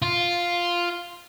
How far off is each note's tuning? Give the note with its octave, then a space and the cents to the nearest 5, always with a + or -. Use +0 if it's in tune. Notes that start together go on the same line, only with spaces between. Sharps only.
F4 +0